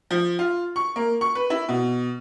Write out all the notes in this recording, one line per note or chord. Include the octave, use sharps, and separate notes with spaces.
F3
F4
C#6
A#3
C#6
B4
E4
B2